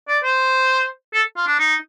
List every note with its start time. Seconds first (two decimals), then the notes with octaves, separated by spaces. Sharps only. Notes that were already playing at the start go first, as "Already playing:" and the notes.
0.08 D5
0.23 C5
1.14 A4
1.37 F4
1.47 D4
1.59 D#4